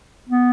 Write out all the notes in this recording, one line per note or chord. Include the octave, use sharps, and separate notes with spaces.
B3